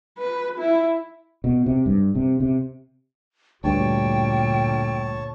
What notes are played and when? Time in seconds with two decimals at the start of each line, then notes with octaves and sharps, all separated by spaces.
0.18 B4
0.58 E4
1.44 B2
1.66 C3
1.86 G2
2.15 C3
2.40 C3
3.64 D2 G2 A#2 D3 C#5 G5 A5